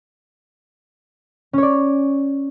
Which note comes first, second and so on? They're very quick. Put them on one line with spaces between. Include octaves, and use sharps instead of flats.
C#4 C#5 D5